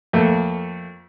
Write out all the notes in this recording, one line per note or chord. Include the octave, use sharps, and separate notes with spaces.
F2 A3 A#3